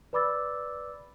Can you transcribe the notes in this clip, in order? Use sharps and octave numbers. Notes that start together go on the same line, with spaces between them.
B4 D5 B5 D6 E6 A6